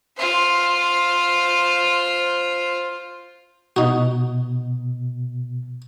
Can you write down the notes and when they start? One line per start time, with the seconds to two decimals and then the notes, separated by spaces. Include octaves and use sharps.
0.17 F4 C5
3.76 B2 D#4 F#4